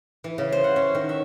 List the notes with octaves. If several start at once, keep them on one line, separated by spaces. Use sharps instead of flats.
E3
C#3
C5
F#5
C#4
D#3
E5